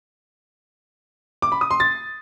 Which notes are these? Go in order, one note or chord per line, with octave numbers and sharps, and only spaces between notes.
D6
B5
D#6
C6
A6